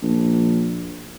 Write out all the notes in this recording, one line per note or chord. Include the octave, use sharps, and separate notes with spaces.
A#1